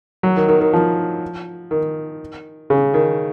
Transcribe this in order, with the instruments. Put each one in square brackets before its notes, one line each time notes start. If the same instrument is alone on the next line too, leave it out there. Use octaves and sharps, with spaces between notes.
[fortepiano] F#3
D#3
D#3
D#3
F3
D#3
C#3
D#3